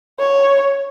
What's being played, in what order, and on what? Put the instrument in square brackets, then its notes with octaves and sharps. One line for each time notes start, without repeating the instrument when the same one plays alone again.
[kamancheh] C#5